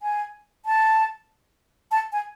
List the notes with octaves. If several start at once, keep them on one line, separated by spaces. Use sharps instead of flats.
G#5
A5
A5
G#5